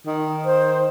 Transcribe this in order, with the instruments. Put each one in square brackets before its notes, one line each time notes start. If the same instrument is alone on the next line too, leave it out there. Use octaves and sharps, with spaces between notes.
[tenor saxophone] D#3
[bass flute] C5